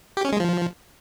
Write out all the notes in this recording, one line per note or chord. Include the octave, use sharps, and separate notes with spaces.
G4
C#4
G#3
F3